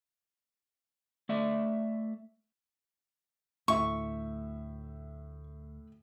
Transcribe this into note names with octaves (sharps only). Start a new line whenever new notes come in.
A3 D5 E5
D2 A2 E5 C#6